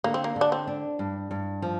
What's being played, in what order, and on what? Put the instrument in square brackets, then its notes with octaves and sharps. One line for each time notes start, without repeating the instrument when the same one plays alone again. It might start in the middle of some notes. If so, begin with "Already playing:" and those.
[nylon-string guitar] D3 [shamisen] A#3
[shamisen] C4
A#3
[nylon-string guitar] D3
[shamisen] D4
C4
[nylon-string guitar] D4
G2
G2
F3